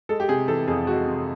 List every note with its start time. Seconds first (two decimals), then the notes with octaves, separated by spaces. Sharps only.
0.09 G#3 A4
0.20 G4
0.29 C3 G#4
0.48 E3 A4
0.67 F2 G#4
0.87 G#3 F#4
1.07 C3